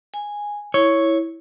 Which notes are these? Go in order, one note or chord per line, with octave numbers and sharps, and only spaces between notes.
G#5
E4 C#5